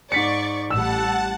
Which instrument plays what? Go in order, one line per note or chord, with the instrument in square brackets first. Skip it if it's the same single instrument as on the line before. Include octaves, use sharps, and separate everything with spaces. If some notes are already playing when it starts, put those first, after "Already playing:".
[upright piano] G#2 B6 C#7 [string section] D5 C#6
[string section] A1 G3 [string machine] F#5 A5 [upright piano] E6 E7